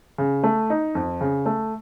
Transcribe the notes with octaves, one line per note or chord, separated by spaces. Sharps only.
C#3
A3
D#4
F2
C#3
A3